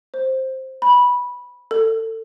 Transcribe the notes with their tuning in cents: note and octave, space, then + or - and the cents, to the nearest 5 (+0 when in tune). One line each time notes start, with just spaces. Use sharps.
C5 +5
B5 -10
A4 +30